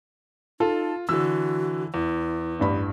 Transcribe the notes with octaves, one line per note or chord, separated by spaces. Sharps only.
D#4 F4 A4
D3 E3 F#4 E6
E2 E4
A1 G2 B5